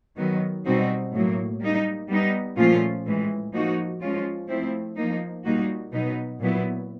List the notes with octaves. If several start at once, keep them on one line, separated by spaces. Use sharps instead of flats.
D#3 F#3 B3
B2 G3 C4 D#4 F#4
A2 F#3 A#3
G3 A#3 D#4
G3 B3 D#4
A#2 F3 A3 C#4 F4
A2 E3 G#3
F3 A#3 D#4 F#4
F3 G#3 C#4 F4
F3 A3 C4 E4
F3 A#3 D#4
A#2 G3 A#3 D#4 F#4
B2 F#3 B3 D#4
A#2 F#3 B3 E4